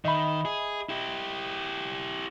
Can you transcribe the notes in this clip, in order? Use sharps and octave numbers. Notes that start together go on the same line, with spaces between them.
D#3 D#5 E5 B5
G#4
E4 G4